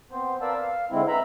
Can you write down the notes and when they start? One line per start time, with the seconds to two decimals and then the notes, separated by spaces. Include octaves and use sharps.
0.11 B3 C4 C5
0.41 A#4 B4 D5 F5 A5 E6
0.61 F5
0.91 D3 G#3 C4 E4
1.08 B4 E5 A#5 B5